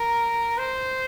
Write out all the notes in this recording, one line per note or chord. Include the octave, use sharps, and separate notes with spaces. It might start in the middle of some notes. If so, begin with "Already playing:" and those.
Already playing: A#4
C5